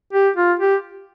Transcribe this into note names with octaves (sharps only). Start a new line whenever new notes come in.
G4
F4
G4